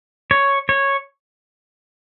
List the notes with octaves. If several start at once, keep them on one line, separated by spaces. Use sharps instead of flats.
C#5
C#5